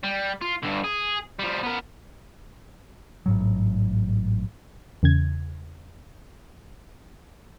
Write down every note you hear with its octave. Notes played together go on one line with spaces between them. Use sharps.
G3
F4
G2 D3
G#4
F3 G3
B3 A#4
A1 G#2 F#3
E2 C#3 G#6